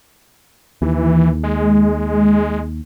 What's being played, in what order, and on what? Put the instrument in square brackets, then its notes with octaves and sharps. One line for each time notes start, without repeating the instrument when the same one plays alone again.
[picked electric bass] D#2 [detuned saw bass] E3
[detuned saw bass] G#3